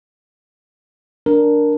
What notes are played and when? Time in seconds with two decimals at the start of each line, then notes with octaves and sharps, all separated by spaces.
1.26 D4 A#4